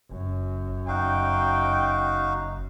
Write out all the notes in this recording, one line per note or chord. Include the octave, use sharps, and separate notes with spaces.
F#1 F#2
F#1 D#4 F#4 F5 G5